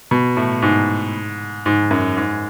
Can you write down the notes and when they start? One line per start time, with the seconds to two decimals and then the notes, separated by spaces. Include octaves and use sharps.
0.11 B2
0.37 A2
0.62 G#2
1.66 G#2
1.91 F#2
2.16 G#2